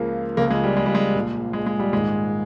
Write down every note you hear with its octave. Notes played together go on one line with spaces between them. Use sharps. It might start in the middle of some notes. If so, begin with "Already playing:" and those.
Already playing: C#2 C#3 F3 A#3
C#2 C#3 F3 A#3
G#3
G3
G#3
G3
G#3
A#1 A#2 F3
G#3
G#3
G3
A#1 G#2 D#3 G#3